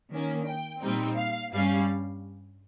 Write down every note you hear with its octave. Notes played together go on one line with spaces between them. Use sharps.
D#3 A#3 C#4
G5
A#2 G3 C4 D#4 G5
F5
G2 G3 C#4 F5